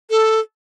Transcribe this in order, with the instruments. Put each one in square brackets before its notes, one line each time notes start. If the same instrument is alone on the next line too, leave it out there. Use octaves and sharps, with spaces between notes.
[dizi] A4